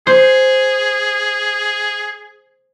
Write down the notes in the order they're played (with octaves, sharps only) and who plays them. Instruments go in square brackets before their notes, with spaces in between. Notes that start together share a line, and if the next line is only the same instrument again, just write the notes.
[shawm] G#4 [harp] C5